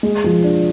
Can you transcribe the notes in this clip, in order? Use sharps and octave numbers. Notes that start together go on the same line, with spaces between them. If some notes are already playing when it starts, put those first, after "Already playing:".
G#3
F3
D4